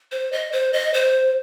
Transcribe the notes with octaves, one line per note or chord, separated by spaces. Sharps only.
C5
D#5
C5
D#5
C5